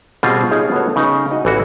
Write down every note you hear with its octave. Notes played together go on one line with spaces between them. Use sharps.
B2 G3 C4 F4 G#4
D#4 F4 G#4 C#5 D#5
B3 F#4 A4 C#5
C#3 D#4
D#4 F#4 D#5
A1 E3 F#4